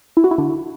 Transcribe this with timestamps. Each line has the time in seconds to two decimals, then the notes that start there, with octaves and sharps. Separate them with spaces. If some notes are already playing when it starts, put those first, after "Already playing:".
0.17 E4
0.24 F#4
0.31 E4
0.38 D3